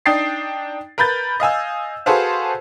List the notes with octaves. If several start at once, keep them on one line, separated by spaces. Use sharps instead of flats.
D4 D#4 G5 D#6 A6 C7
A#4 B4 B5 G6 A6
D#5 F5 G#5 E6
F#4 G#4 A4 B4 C5 F5